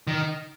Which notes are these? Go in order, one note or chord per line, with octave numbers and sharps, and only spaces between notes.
D#3